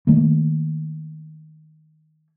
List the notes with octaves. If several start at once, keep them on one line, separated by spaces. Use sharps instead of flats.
D#3 A3 A#3